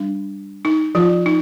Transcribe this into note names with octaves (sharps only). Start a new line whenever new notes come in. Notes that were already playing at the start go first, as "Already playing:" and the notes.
Already playing: G3 D4
D#4
F3 F4
D#4